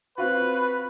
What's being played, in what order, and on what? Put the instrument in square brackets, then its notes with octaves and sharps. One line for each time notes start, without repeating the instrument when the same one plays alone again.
[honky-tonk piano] C4 F4 F#4 [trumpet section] B4